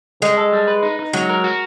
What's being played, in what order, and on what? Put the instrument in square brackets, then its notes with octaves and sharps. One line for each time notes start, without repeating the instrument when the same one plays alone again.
[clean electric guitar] G3 [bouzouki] G#3
[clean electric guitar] A4
G3
B4
D#4
D#4
[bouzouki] F#3 [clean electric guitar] G#3
[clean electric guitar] A#4
F#4